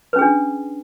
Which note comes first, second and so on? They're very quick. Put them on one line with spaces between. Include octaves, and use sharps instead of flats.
B4 C#4 G#4 D4